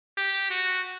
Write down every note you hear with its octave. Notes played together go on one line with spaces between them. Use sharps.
G4
F#4